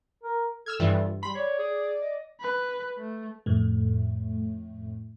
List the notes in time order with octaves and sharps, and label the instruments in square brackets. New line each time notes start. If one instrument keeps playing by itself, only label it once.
[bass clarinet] A#4
[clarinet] A4 [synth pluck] E6 F6 G#6
[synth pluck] G2 E3 [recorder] F4
[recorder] G3 [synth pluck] B5 [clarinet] C6
[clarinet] C#5 [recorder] D5
[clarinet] G#4
D#5
[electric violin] B4
A3
[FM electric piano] F2 A2 A3